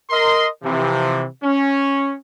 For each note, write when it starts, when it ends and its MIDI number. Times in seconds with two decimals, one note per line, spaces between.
0.11 0.47 70
0.11 0.47 75
0.11 0.47 84
0.63 1.25 48
0.63 1.25 52
0.63 1.25 53
1.43 2.15 61